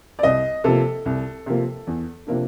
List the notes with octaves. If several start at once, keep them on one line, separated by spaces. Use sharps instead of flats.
D5
C2 D#5
C3 F3 A#3 A4
C2
C3 F3 A#3
E2
C3 F3 A#3 D4